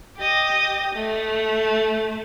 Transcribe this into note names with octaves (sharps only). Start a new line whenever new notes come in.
G4 D#5
A3